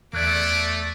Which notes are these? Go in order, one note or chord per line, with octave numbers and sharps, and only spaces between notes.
E2 A3 D5 D6 F#6 G#6